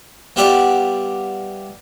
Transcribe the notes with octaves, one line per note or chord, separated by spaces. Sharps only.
G3 B3 E4 F4 B4 D5